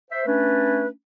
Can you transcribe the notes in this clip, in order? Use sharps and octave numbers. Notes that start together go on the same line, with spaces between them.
C5 E5
A3 C#4 D4 B4